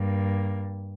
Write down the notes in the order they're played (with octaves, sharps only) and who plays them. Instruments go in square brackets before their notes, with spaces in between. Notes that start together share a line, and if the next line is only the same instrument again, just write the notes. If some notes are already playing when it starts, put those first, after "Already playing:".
Already playing: [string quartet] G2 A#3